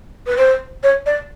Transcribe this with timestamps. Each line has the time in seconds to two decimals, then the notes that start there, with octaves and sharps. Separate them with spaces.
0.27 B4
0.37 C5
0.83 C#5
1.06 D5